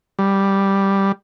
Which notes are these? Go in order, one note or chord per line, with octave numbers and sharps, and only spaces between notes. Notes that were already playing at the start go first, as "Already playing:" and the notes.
G3